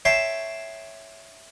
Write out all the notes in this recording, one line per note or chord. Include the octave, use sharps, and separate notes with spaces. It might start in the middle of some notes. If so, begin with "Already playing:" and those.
C#5 E5 G5 A5 C6